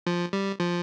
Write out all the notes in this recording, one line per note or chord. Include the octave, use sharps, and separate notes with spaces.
F3
G3
F3